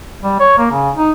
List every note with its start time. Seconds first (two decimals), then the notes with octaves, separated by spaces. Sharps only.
0.23 G3
0.40 C#5
0.58 A#3
0.71 C#3
0.96 D#4